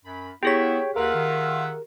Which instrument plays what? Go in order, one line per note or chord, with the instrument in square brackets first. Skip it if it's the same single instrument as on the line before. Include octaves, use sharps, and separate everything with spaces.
[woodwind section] F#2 B5
[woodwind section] B3 E4 [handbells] G4 G#4 B6 [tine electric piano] C#5 G5
[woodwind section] D#2 B4 [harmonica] F4 E5 F#5 [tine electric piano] A#4
[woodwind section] D#3